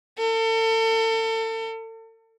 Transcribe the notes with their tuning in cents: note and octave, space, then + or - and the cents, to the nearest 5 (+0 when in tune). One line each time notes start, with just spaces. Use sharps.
A4 +35